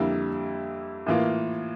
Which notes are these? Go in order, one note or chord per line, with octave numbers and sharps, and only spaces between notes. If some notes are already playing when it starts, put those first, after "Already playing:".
Already playing: F2 D3 G3 A#3 E4
A2 E3 A#3 F4